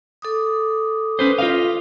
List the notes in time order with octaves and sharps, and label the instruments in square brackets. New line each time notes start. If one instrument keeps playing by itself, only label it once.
[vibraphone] A4 D6 D#6
[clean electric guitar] C#4 B4 C5
F4 D#5 F5